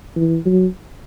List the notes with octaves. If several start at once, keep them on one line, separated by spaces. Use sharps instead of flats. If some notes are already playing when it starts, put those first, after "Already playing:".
E3
F#3